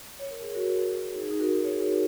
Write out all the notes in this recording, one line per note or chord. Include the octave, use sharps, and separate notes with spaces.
C#5
A#4
G#4
F#4 A#4
D#4 G#4
D#4 G#4
F#4 A#4
F#4 A#4
G#4 C#5